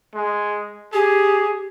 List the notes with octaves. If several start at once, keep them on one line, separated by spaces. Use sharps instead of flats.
G#3
G4 G#4